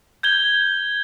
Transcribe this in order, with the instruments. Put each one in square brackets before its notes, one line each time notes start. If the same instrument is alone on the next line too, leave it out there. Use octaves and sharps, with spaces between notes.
[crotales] G6 G#6 G7